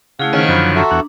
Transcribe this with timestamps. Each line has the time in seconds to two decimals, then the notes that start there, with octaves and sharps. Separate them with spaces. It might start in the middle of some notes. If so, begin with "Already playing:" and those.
0.20 C#3 A3 E4 G#4 F5 F#5
0.33 D#3 C#4 C5 D#5
0.49 F#2 D3 F3 C5 B5
0.75 F#4 A4 E5 A#5 C6
0.91 E2 D4 F#5